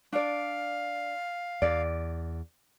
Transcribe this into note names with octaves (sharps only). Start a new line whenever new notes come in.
D4 D5 F5
E2 D5